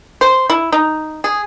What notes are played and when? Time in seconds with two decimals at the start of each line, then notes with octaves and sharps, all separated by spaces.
0.21 C5
0.50 E4
0.72 D#4
1.24 G#4